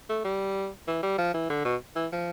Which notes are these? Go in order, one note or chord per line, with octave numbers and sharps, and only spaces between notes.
A3
G3
E3
G3
F3
E3
D3
B2
E3
F3